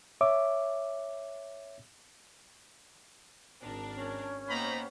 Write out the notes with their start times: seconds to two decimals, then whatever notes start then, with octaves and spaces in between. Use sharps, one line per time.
0.21 C#5 E5 D6
3.62 G#1 D4 A#4
3.95 C#4
4.48 A#3 B3 D#4 G4 C5 A#5 B5